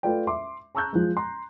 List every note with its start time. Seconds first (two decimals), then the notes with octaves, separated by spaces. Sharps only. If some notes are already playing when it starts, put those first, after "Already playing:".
0.03 A3 F4 B4 D5 G5
0.27 E5 C6 D6
0.75 A5 A#5 C#6 E6 F#6 G6
0.93 F3 G#3
1.17 A#5 C6